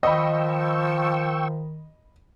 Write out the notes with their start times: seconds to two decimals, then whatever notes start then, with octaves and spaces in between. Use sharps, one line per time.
0.03 D#3 F3 D#5 G5 B5 C#6 E6